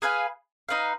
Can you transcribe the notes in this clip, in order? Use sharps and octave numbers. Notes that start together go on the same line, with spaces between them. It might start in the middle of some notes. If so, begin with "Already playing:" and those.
G#4 B4 F5 G#5
D#4 B4 F5